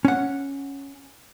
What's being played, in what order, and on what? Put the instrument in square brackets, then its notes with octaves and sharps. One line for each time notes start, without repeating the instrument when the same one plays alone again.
[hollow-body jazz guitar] C#4 F#5